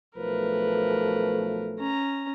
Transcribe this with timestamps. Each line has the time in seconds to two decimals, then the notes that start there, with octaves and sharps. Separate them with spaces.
0.17 B1 F3 A3 A#4 B4
1.78 C#4 A#5